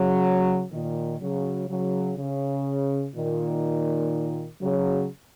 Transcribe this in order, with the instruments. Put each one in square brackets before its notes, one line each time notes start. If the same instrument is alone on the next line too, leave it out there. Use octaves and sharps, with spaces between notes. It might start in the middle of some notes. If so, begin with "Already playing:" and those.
Already playing: [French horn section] C#3 F#3
A#2 D#3
C#3 F#3
C#3 F#3
C#3
A#2 D#3
C#3 F#3